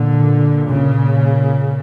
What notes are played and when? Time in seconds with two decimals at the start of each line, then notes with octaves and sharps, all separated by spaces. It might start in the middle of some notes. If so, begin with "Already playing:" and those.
Already playing: A#2 D3
0.67 C#3